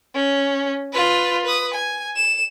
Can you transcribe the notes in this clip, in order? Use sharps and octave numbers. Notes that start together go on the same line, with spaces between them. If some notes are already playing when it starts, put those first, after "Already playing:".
C#4
F4 B4
B4 D#6
G#5
E7